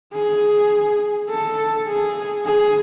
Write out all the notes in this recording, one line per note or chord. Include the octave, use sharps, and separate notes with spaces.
G#4
A4
G#4
G#4